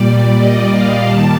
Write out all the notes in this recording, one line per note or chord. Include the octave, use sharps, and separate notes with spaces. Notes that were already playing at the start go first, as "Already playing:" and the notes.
Already playing: A#2 G3 D5
D#5
F5
D#2 D#3 G3 A5